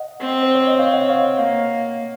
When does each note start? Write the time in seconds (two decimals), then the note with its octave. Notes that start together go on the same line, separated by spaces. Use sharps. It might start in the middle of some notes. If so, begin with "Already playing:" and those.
Already playing: D#5 F#5
0.20 C4
0.43 C5
0.55 C#5
0.67 D#5
0.79 C4 C#5 F5
0.94 D#5 F#5
1.09 C#5 F5
1.39 A#3 C#5 F5